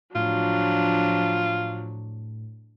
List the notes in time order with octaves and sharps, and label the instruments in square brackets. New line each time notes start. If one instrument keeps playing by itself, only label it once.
[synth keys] A2 [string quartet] F3 F#3 D4 [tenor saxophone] F4